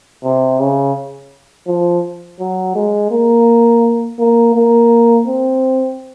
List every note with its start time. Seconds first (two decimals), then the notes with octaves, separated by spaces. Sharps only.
0.24 C3
0.59 C#3
1.67 F3
2.39 F#3
2.75 G#3
3.11 A#3
4.19 A#3
4.55 A#3
5.27 C4